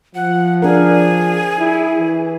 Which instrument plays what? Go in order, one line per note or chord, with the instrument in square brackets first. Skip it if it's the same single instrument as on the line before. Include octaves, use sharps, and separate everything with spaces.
[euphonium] F3 [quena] F#5
[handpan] D4 A#4 [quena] G#4
[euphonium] E4
E3